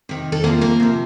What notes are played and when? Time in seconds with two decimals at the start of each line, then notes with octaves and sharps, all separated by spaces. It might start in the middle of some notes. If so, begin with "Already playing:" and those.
0.09 C3 D#3
0.32 A4
0.44 C3 F3 A#3 A#4
0.61 A#3 A#4
0.80 C3 F3